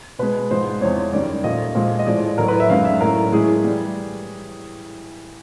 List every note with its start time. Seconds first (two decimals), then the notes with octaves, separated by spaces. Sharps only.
0.19 B2 G#3 B4
0.50 G#2 F3 G#3 C5
0.81 E2 C3 F3 G#3 C#5
1.13 F#2 D#3 G3 D5
1.44 A#2 F3 A3 D#5
1.75 A#2 F3 G#3
1.99 D#5
2.06 A2 F3 G#3 D5
2.38 A2 F#3 A3 A#4
2.48 B4
2.60 E5
2.70 F#2 D#3 G#3 F5
2.85 E5
3.01 A2 F#3 A3 A#4
3.32 A2 E3 G#3 G#4
3.64 E3 G3